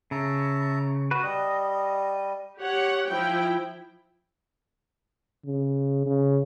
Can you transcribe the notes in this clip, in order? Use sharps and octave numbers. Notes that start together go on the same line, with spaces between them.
C#3 E5 A5 A#5
F#4 B4
G3 D#5
G4 C#5 F#5
F3 E4 G5
C#3
C#3